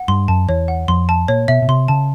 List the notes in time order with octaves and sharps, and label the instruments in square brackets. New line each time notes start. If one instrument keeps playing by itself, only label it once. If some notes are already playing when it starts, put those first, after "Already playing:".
Already playing: [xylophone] F#5
[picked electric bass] G2 [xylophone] C6
[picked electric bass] F#2 [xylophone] A5
[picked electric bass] E2 [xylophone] C#5
[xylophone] F#5
[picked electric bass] F2 [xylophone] C6
[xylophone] A5
[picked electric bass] A#2 [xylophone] C#5
[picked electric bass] B2 [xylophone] E5
[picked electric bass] B2
[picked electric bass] C3 [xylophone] C6
[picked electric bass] C#3 [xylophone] A5